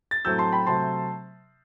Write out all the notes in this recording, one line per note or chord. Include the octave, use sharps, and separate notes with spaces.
A6
A2 F#3 A3 C4 E6 G6
A5 C6
G5 B5
C3 F#3 A3 C4 A5 C6